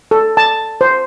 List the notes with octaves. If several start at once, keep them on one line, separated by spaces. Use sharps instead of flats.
A4
A5
C5